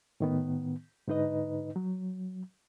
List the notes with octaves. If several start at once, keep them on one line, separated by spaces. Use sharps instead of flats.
A2 D#3 B3
G#2 D3 D#4 B4 D#5
F#3